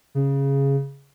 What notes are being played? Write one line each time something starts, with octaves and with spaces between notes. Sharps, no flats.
C#3